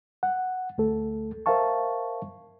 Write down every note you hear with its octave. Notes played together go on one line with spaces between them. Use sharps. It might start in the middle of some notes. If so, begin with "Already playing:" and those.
F#5
D2 A3 A4
A#4 C5 E5 F5 A5 C#6